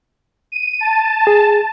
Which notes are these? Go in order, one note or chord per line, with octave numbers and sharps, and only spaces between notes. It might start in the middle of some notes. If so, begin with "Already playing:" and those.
D#7
A5
G#4